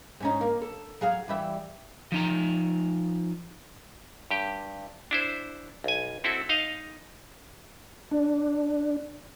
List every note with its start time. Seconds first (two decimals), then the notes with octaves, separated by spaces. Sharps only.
0.20 G#2 C#4 D#4
0.41 A#3
0.62 A4
1.01 F#3 G#4 F5
1.28 E3 G3 E5
2.12 F3 D#4 A#5
4.31 G2 G4 G5
5.11 D4 E4 C5
5.84 B1 G#5
6.24 C4 E4 F#4 A4 E5
6.49 D#4 D#5 F5
8.11 D4